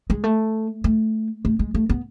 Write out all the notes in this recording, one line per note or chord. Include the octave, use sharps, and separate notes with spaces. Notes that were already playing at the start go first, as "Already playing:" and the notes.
G#3
A3
A3
A3
G#3
A3
B3